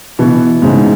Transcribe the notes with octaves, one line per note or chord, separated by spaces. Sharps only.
B2 E3
G#2 C#3